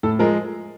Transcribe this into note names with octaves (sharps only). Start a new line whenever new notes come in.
A2 A4
F3 G#3 A#4